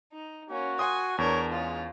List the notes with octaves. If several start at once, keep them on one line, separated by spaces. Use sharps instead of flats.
D#4
A#3 C#4 F#4
F#5 G#5 C6 D#6
E2 D4 A#4 C#5
G#3 C#4 F4